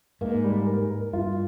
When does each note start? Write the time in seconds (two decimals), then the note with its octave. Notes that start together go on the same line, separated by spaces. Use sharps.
0.21 G#2 A#3
0.44 G3
0.66 A#4
0.90 A#4
1.13 G2 F4